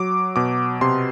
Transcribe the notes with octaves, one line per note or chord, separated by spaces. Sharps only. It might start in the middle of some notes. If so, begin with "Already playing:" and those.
Already playing: F#3 D6
B2 D6
C3 C6